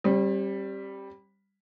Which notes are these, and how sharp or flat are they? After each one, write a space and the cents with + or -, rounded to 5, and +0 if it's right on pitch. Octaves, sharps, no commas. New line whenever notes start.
G3 +0 C4 +45